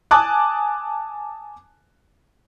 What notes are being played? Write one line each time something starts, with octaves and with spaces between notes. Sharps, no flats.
G#5 A5 D6 D#6 F#6